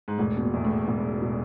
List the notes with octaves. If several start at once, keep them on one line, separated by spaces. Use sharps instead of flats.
G#2
E1 A2
B2
A#2
E2
A2
E1 A2
B2